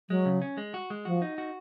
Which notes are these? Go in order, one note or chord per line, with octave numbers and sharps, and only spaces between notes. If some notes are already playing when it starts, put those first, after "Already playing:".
F#3 G#3
C#3
C#4
G#3
F#4
G#3
F3 F#4
D#4
F#4